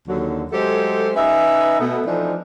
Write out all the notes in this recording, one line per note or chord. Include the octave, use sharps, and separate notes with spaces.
D#2 D3 F#3
F#3 G#3 A3 G4 A4 C5
C#4 D#4 B4 D#5 E5
B2 A3 B3
E3 F3 A3 C4 D4 D#4